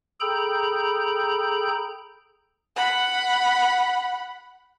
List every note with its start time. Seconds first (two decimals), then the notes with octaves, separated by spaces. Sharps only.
0.20 G#4 A4 G5 A#5 B5 G6
2.76 F#5 B5